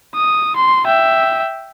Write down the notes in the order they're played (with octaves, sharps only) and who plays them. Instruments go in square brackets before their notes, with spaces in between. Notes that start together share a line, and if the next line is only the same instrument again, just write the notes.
[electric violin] D#6
C6
E5 G5